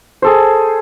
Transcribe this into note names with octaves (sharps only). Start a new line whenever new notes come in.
G#4 A4 C5